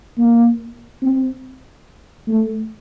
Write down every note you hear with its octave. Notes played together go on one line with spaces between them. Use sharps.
A#3
C4
A3